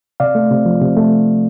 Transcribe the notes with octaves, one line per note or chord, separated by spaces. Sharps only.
C3 D5 F5
A3
C3
F3
C3
A3